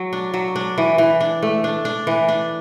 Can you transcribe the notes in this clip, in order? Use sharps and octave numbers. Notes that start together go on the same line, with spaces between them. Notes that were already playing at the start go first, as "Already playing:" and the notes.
Already playing: F#3
D4
F#3
D4
E3
E3
D4
A3
D4
D4
E3
D4